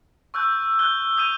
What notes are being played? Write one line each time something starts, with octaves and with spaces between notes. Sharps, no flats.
C#6 E6 F#6 G6
F#6 G6 G7
D#6 G6 D#7